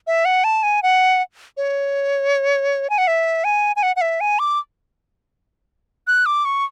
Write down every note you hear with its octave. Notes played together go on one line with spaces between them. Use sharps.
E5
F#5
A5
G#5
F#5
C#5
G#5
F#5
E5
G#5
G#5
F#5
F#5
E5
G#5
D6
F#6
D6
C#6